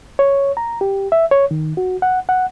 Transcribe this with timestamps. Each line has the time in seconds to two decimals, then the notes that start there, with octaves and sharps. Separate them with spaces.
0.19 C#5
0.57 A#5
0.81 G4
1.12 E5
1.31 C#5
1.51 D#3
1.77 F#4
2.02 F#5
2.29 F#5